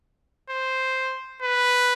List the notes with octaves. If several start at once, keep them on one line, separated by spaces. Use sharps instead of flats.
C5
B4